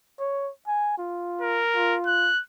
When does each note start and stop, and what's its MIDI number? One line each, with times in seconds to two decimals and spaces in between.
0.20 0.51 73
0.67 0.96 80
0.98 1.64 65
1.41 1.96 70
1.76 2.31 65
2.07 2.41 90